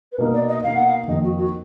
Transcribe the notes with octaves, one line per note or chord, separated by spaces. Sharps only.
B4
B2 A#3 D#4 A#4
D5
D#5
B2 A#3 D#4 F5
F#5
F5
F2 D#3 A#3 D#4 D#5
F#4
F#4